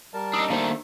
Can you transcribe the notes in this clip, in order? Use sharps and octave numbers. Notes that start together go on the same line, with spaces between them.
G3 A#4 A5
D4 D#4 D#6 E6
D#3 A3 A#3 D4 C5